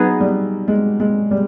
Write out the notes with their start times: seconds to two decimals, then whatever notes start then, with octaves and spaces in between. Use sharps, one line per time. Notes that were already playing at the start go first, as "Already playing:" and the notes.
Already playing: F#3 B3 D#4 G#4 B4
0.21 G3
0.68 G#3
1.00 G#3
1.31 G3